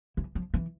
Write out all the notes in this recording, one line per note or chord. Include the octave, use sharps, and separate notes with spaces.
E3
F3
E3